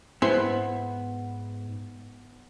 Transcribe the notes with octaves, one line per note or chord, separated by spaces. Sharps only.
G#2 B3 E4 C5